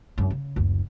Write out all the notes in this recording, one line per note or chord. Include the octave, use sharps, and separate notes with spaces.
F#2 C#4
C#3
F#1 D2